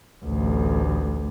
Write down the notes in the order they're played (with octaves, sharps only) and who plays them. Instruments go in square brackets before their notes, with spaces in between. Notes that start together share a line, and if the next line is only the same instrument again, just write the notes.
[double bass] A1 D2